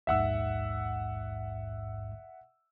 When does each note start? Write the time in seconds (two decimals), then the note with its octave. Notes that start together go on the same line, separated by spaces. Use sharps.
0.07 A#1 D#2 G#2 E5 F#5 E6